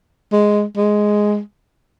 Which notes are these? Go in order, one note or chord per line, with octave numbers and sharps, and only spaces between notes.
G#3
G#3